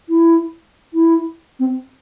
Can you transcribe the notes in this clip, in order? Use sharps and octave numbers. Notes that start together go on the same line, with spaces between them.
E4
E4
C4